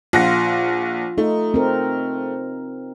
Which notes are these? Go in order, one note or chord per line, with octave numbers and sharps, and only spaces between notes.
A#1 F4 F#5 A#6
A3 D#4
C4 A#4